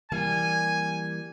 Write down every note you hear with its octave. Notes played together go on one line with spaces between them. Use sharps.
E3 G3 A#3 G#5